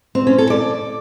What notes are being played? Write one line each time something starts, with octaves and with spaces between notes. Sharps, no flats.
C4
C#4
A4
D5